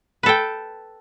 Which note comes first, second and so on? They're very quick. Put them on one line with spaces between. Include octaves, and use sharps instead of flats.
B4 A4 G5